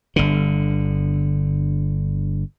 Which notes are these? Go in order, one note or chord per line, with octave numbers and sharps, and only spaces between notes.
G1 D3